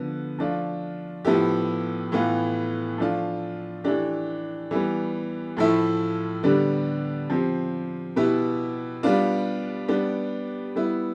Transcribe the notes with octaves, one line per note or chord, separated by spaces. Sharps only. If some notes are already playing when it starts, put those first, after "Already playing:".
Already playing: D3 F3 B3
F3 A3 D4 F4
A2 F3 B3 E4 G4
A2 E3 B3 F4
F3 A3 D4 F4
E3 A3 D4 G4
E3 G3 B3
A2 F3 A3 E4
D3 G3 B3 D4 G4
F3 C4 G4
B2 B3 E4 G4
G3 B3 D4 F4
G3 B3 D4 G4
G3 B3 E4